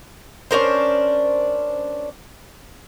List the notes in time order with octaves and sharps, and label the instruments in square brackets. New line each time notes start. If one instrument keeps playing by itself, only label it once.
[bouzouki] C#4 D4 A#4 C5